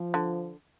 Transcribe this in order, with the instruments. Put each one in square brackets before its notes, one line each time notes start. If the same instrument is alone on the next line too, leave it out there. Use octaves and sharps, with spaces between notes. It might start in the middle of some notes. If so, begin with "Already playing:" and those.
Already playing: [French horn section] F3
[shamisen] D3